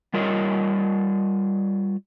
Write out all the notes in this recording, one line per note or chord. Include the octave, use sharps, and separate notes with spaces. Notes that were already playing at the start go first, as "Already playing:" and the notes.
G3 F4 A#4 C#5 D#5